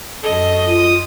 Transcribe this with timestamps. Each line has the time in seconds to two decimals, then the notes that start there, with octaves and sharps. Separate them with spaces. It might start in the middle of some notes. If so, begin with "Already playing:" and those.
0.24 F#2 A4 D#5
0.66 F4 D#6